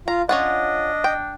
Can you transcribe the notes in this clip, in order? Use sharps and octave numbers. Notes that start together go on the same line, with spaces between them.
F4 F5 A#5
C#4 D4 F4 D#5 F#5
G5